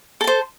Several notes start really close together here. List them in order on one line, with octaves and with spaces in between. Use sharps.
A4 A5 C5